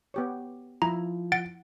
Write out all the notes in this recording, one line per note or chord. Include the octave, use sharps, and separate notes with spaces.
B3 G4 C#5
F3 E4 A#5
F#5 A6 D7